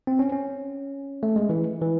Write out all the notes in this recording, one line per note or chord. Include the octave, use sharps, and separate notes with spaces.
C4
C#4
C#4
A3
G#3
E3
E3